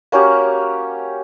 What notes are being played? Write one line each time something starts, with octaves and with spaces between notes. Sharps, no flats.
A#3 C#4 F#4 G4